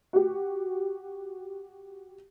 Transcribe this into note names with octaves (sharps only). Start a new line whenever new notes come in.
F#4 G4